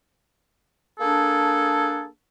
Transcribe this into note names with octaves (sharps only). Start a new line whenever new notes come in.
A#3 D4 G#4 A4